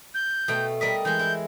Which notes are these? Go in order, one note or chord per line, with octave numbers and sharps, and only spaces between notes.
G6
B2 A3 G5
G3 A#4 D#5 B6
E3 G#3 G6
E4